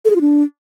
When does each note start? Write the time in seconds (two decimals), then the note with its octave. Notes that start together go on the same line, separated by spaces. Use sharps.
0.05 A4
0.10 G#4
0.15 F4
0.21 D4